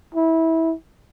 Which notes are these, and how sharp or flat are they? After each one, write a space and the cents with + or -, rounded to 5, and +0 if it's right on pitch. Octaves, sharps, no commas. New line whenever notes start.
E4 -20